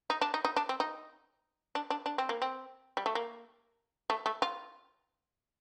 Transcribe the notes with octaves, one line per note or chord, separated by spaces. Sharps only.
D#4
D4
D#4
D#4
D4
C4
D#4
D4
D4
D4
C4
A#3
C4
G3
A3
A#3
A3
A3
F4